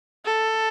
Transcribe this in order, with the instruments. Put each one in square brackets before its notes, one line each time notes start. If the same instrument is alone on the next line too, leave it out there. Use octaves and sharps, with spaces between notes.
[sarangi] A4